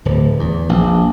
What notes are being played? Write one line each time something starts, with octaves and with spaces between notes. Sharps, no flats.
D1
E2
A#1